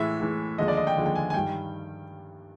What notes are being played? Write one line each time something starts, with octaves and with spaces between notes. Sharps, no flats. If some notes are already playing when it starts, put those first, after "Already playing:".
Already playing: A2 E3 G#3 E5
A2 E3 G#3
D#2 D3 F3 G#3 D#5
D5
D#5
G5
D#2 D3 F3 G#3
G5
G#5
G#5
G2 D#3 G3 G5